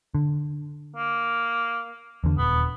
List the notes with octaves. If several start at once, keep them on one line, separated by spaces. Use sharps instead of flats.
D3
A#3
E2 D3
D#1 B3